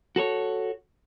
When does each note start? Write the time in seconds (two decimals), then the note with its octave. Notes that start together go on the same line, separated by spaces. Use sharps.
0.16 F#4 A4 B4 C#5